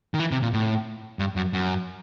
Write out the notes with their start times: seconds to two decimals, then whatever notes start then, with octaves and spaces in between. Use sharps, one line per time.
0.14 D#3
0.20 E3
0.32 C3
0.42 A#2
0.53 A2
1.19 G2
1.36 F#2
1.53 F#2